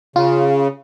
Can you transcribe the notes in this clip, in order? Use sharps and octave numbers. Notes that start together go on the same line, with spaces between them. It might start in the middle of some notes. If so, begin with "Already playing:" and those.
C#3 F4